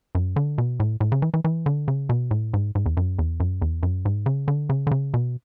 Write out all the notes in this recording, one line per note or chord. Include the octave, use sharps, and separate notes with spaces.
F#2
D3
B2
A2
A2
C#3
E3
E3
E3
D3
C#3
B2
A2
G#2
G#2
E2
F#2
E2
F#2
E2
F#2
G#2
C#3
D3
C#3
D3
C#3
B2